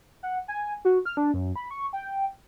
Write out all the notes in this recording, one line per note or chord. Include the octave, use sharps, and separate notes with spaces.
F#5
G#5
F#4
F6
D4
F#2
B5
C#6
G5